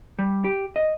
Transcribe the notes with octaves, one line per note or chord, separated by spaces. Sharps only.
G3
G4
D#5